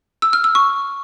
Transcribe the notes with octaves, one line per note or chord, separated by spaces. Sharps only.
E6
F6
E6
C#6